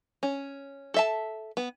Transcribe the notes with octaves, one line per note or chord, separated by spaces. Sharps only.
C#4
A4 E5 A5
B3